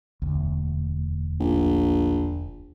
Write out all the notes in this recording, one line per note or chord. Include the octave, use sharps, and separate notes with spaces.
E1 D2
A#1